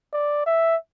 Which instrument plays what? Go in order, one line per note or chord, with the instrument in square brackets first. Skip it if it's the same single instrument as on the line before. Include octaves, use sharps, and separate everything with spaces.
[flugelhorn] D5
E5